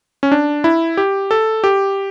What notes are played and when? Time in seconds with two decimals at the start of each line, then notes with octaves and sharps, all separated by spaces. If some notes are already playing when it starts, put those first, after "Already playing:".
0.23 C#4
0.32 D4
0.64 E4
0.97 G4
1.31 A4
1.64 G4